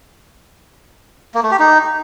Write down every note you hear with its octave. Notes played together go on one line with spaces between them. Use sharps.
A#3
A3
G4
D#4